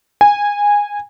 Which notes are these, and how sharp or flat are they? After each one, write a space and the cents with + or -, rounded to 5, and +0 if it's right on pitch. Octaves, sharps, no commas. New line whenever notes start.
G#5 -15